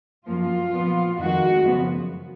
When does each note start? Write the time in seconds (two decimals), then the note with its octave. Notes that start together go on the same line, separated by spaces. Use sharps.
0.26 F#2 F3 A#3 F4
0.72 A#2 F3 B3
1.17 F2 D#3 G#3 F#4
1.63 F#2 C#3 F3 B3